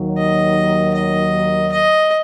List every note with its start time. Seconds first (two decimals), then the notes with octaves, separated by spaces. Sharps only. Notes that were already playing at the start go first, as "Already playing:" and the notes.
Already playing: D#2 D#3 F#3
0.18 D#5
0.95 D#5
1.72 D#5